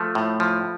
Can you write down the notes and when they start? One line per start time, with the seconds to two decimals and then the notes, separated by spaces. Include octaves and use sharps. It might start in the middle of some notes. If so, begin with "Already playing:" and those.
Already playing: F3 A3
0.15 A2
0.40 F3